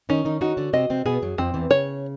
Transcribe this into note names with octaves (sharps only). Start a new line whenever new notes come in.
D#3 C#4 D#4
D#3 D#4
D#3 D#4 F#4
D3 D4
C3 C4 D#5
C3 C4
B2 B3 G#4
F#2 F#3
F2 F3 C4
E2 E3
C#3 C#5